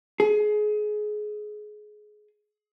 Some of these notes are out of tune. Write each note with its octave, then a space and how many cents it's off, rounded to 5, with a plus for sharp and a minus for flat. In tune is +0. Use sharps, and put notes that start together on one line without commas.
G#4 +25